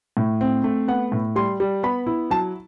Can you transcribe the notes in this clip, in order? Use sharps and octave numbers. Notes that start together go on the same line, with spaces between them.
A2
C4
A3
B3 F#5
A2
G3 C6
G3
B3 B5
E4
F#3 A5